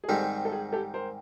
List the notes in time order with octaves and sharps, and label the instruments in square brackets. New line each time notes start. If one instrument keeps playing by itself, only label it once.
[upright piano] G#4
[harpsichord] G#2 D#3 G3 C4 [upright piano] G4 A4
[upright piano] A4
G#4
G4 A4
A#4 C5